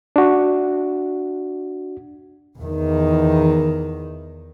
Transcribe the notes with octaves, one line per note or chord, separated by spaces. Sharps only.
D4 F#4
E2 D#3